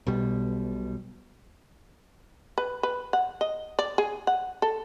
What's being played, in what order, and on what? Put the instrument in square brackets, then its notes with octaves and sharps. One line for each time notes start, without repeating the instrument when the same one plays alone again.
[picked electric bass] B1 B2 G3
[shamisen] B4
B4
F#5
D#5
D5
G#4
F#5
A4